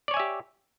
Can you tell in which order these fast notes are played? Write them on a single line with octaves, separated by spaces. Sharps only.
D5 C#5 G#5 E5 G4